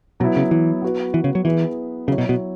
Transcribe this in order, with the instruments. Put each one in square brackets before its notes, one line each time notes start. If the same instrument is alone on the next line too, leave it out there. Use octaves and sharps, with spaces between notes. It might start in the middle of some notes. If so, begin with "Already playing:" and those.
[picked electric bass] B2 [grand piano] F#3 B3 E4
[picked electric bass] C#3
E3
[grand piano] B3 F#4 B4
[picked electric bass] E3
C#3
F#3
[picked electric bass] E3 [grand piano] B3 E4 G#4 B4
[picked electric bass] C#3 [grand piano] F#3 E4 C#5
[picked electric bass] B2
B2